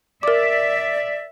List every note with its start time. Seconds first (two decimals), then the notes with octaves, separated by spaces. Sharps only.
0.23 A#4 D5 E5 D6